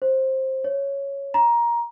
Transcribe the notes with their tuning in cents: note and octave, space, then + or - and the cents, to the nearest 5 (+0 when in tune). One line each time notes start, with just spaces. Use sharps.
C5 +15
C#5 +0
A#5 +15